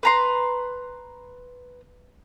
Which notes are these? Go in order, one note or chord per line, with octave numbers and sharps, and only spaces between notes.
B4 A#5 C6